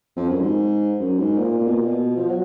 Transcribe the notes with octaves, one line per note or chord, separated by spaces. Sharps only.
F2
F#2
G#2
F#2
G#2
A#2
A#2
B2
A#2
B2
F3
F#3